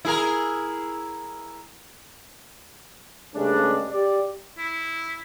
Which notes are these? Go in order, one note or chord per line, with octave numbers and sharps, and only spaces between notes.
E4 G#4 A#4
G2 C#3 G#3 A3 C#4 D4
G4 D5
E4